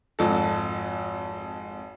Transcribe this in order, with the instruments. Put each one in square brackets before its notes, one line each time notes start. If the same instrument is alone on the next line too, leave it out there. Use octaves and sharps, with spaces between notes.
[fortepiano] G#1 F2 A4